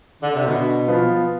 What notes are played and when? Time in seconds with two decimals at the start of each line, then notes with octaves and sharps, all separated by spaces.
0.21 D3
0.34 C3
0.46 B2 D3
0.88 F3 B3 F4